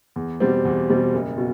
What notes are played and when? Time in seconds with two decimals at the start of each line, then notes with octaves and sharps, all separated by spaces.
0.16 E2
0.40 B2 G3 C4
0.65 E2
0.89 B2 G3 C4
1.13 F#1
1.38 B2